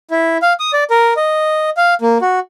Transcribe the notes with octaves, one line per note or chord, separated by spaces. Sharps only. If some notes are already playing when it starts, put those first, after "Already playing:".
E4
F5
D#6
D5
A#4
D#5
F5
A#3
F#4